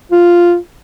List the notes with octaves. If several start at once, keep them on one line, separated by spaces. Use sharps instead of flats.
F4